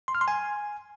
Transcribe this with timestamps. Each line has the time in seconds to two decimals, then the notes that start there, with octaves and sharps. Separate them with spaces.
0.08 C6
0.15 F6
0.21 C6
0.28 G#5